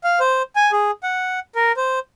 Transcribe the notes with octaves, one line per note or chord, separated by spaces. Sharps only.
F5
C5
G#5
G#4
F#5
A#4
C5